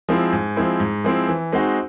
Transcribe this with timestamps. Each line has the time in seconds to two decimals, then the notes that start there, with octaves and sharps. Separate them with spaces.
0.09 F3 G#3 C4 E4
0.33 G#2
0.56 F3 G#3 C4 E4
0.80 G#2
1.04 F3 G#3 C4 E4
1.28 E3
1.52 G#3 C4 D#4 F#4